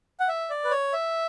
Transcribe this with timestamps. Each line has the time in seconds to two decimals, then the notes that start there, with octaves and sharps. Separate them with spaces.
0.20 F#5
0.28 E5
0.50 D5
0.65 B4
0.71 C#5
0.93 E5